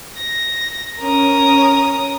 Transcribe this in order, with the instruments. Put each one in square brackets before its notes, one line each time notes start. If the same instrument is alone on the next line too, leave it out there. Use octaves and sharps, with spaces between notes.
[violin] A#6
[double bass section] C#4 [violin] A#4 D#6